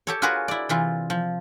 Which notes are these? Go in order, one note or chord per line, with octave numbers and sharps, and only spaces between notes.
G4 A4 C#5
F4 F#4 G#4 A#4 B4 C#5
E4 D5
C3 E3 F4
F3